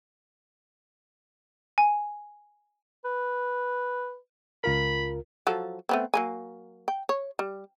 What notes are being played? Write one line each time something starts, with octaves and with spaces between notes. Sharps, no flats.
G#5
B4
C#2 F4 A#4 B5
F3 F#3 A4
A3 B3 C4
F#3 A#3 G#5
G5
C#5
G3